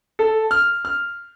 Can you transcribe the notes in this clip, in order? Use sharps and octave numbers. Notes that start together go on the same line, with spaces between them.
A4
F6
F6